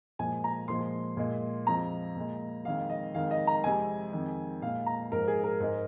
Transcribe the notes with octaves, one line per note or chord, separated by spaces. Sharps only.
A#2 F3 G#3 G#5
A#5
A#2 F3 G#3 C6
A#2 G#3
F2 F3 G#3 A#5
A#2 G#3
F2 D#3 G#3 F5
D#5
F2 D#3 G#3 F5
D#5
A#5
F2 C3 G#3 G#5
F2 D#3 G#3
A#2 G#3 F5
A#5
G#2 F3 G#3 A#4
G#4
A#4
G#2 G#3